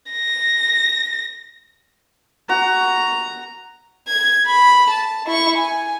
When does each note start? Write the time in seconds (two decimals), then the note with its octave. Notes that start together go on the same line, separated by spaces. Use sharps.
0.11 A#6
2.49 F#4 A#5
4.08 G#6
4.46 B5
4.91 A5
5.26 E4 C#6
5.58 G#5